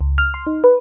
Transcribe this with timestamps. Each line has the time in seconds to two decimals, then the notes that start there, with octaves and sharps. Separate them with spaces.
0.01 C#2
0.18 F6
0.34 C6
0.47 D#4
0.64 B4